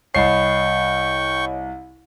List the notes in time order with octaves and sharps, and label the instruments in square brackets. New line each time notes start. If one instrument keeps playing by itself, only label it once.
[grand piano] C2 C7 [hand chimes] C#5 D#5 B5 [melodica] G5 C#6